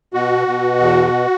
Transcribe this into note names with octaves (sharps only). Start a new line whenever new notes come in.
B2 F#4
B2
E2